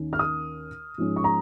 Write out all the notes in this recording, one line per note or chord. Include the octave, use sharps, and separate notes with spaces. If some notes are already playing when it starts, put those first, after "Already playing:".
Already playing: D#2 D#3 C#4
F6
D#6
G#2 F3 G#3 C#4
C#6
A#5